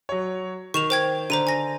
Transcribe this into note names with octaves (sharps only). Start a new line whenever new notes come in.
F#3 C#5
D#3 C#6 E7 F7
C5 G5 G#6
D3 C5 A#5 D#7
G#5 A#6